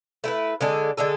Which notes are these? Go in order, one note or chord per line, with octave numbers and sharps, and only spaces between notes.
A3 E4 B4
D3 G#3 D4 A4
D3 G#3 D4 A4